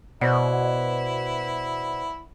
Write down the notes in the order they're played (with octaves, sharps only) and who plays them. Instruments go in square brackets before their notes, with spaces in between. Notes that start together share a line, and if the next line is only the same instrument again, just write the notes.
[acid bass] B2 [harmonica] E4 [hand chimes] C5 D5 F#5